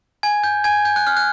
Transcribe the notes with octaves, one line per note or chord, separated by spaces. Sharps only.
G#5 G#6
G6
G#5 G#6
G6
F#6
F6
F#6